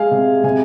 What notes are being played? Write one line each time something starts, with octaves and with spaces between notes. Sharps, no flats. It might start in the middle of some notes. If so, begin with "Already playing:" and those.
Already playing: G#3 F5 G#5
C3
C3 G#5